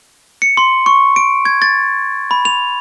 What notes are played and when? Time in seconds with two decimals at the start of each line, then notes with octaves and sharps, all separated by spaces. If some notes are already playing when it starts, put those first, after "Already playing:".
0.42 C#7
0.57 C6
0.86 C#6
1.16 D7
1.45 G#6
1.62 A6
2.31 B5
2.45 F7